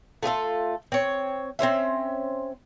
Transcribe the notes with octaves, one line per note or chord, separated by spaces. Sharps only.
A3 F4 G#4 A4
C4 C#5
C4 C#4 C5 E5